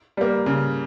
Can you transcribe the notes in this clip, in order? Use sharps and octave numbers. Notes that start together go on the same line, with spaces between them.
G3 A#3
C#3